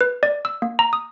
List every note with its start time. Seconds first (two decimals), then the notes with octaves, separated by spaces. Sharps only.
0.01 B4
0.23 D5
0.45 E6
0.62 A#3
0.79 A#5
0.93 D#6